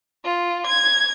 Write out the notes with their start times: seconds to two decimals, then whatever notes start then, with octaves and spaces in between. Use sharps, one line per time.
0.25 F4
0.66 G#6